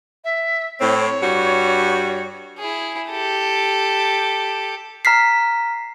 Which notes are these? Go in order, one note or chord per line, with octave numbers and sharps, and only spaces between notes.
E5
A2 C4 C#5
G2 G3 F#4
E4 G#4
G4 A4
A#5 F6 B6 C7